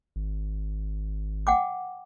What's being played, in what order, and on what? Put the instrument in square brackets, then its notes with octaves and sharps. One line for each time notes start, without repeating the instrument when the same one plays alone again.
[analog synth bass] G#1
[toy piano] F#5 G5 D6